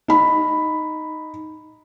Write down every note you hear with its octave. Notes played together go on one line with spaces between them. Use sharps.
D#4 B5